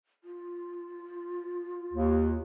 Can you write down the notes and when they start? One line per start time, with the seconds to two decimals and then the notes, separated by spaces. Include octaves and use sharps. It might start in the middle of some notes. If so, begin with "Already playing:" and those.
0.24 F4
1.93 D#2